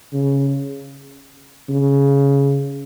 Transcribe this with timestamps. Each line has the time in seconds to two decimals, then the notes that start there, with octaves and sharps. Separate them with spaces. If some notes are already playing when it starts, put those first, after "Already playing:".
0.13 C#3
1.69 C#3